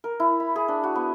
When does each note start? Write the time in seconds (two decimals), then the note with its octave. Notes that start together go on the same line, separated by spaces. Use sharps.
0.04 A#4
0.20 E4
0.40 B5
0.56 G#4
0.68 D4
0.83 F#4
0.95 B3